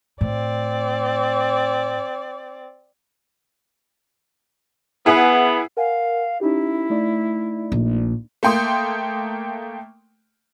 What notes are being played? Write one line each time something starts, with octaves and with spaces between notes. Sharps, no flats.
A2 C4 D5
B3 E4 G#4 F#5
A#4 F5 F#5 G#5
C#4 D#4 E4 G4
A3 D#4 D5
A#1
A3 A#3 G5 C6 D#6